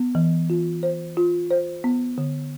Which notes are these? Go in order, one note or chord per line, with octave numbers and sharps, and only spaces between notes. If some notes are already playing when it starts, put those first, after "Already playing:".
Already playing: B3
E3
F4
C5
F4
C5
B3
D3